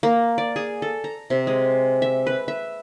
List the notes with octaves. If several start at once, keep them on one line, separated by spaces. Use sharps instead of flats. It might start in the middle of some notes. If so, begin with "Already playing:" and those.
A#3
D5
G#4
A4
A#5
C3
G#3
E5
B4
E5